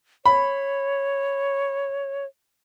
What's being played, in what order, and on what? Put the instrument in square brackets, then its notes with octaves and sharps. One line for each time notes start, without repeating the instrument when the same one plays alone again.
[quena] C#5 [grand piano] B5